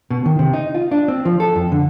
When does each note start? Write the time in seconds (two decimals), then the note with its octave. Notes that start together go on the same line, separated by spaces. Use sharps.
0.11 B2
0.26 D#3
0.39 C3
0.53 D#4
0.75 F4
0.91 D4
1.08 C4
1.25 F3
1.40 A4
1.55 F2
1.72 D3